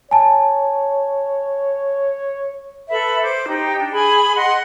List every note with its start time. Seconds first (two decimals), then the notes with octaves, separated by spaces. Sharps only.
0.11 C#5 G#5 A5
2.89 A4 B4 E5 B5
3.22 C5 D6
3.47 D#4 G4 G5
3.77 D4
3.92 G#4 G#5 B5
4.35 D#5 F#5 C6